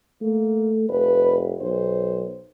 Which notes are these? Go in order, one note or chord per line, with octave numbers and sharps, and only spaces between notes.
A3 A#3
F1 B4
B1 C5